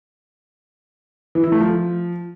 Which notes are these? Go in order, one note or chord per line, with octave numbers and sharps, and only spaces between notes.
E3
E4
A3
F3